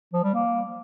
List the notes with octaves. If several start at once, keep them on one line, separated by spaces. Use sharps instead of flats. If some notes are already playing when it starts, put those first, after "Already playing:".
F3
G3
A#3